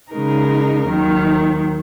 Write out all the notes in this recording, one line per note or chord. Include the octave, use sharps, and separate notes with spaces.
C#3 G#3 D#4 A#4
D#2 D#3 F#3